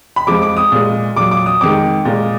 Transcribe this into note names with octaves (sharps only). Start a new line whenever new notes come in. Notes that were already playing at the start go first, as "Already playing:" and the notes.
B5
F2 F3 G#3 D6
D6
D#6
A#2 G#3
A#2 F#3 D6
D6
D#6
F2 D#3 G#3 D6
A#2 G#3